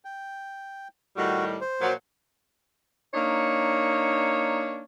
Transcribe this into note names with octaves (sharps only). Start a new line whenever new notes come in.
G5
A2 D#3 G3 F#4
C5
A#2 F3 F#3
A#3 D4 D#4 C#5